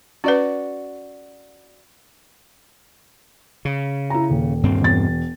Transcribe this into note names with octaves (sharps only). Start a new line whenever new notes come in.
C#4 F#4 B4 D5 F#5
C#3
E4 A#5
D#1
G2 C4
E1 A6